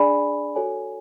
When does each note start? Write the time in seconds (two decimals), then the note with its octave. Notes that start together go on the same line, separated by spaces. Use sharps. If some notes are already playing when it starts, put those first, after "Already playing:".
Already playing: D4 G#4 D5 G#5 B5
0.56 F#4 A4 C#5 G#5